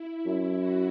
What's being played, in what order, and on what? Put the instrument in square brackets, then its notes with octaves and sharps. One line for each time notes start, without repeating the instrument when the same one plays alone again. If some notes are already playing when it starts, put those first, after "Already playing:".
Already playing: [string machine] E4
[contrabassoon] F#2 [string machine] E4
[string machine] F#4